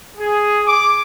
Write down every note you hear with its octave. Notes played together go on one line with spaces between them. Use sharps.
G#4
D6